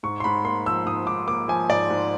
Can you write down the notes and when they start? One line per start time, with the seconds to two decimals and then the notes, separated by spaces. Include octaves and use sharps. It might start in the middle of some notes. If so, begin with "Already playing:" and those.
0.03 G#2 C#6
0.20 C6
0.24 G#2 B5
0.44 A#3 C6
0.66 F3 E6
0.86 G#2 D#6
1.07 G#2 D6
1.27 A#3 D6
1.48 F3 G#5
1.69 G#2 D5
1.90 G#2